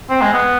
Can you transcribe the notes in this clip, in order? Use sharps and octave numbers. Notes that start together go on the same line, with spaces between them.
C4
G#3
B3